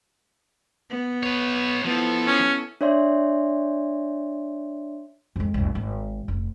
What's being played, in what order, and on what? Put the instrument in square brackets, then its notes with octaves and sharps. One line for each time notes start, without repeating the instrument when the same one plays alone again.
[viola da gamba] B3
[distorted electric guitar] B4 C#5
[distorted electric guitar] F3 [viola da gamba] B3 E4 A4
[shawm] C#4
[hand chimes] D4 C#5 D5 E5 C6
[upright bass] F2 G#3
F1 C2
G#1
F1